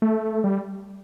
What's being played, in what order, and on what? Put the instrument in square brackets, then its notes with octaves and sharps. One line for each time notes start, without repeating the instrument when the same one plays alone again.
[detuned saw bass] A3
G3